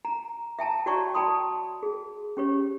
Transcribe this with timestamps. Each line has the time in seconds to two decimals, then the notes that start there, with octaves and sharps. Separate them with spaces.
0.05 A#5
0.59 E5 G5 A5 A#5
0.86 F#4 C#5 D5 G5 A#5 C#6
1.14 D5 G5 A5 B5 C6 D#6
1.83 G#4
2.37 C#4 G4 C#5